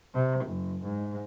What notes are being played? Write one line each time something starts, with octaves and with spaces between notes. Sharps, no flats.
C3
F#1
G#2